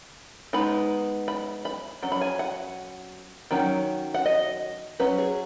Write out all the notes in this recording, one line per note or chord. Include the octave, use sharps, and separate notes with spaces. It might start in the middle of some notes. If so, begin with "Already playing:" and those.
G#3 B3 D#4 B5
B5
B5
F#3 C#4
B5
G#5
F#5
D#3 F#3 C#4
F#5
D#5
F#3 C#4 B4
G#4